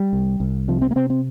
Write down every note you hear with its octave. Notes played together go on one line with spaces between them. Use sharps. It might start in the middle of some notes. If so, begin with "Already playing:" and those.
Already playing: G3
C2
C2
C3 F3
C4
A#3
C3 C4
C4